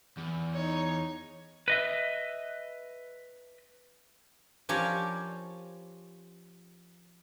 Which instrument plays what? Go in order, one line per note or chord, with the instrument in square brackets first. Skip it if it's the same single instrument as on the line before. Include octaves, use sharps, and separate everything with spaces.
[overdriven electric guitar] E2
[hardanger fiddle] D#4 C#5
[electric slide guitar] B4 D#5 E5
[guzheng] F3 C#4 G4 A#4 C#5 D5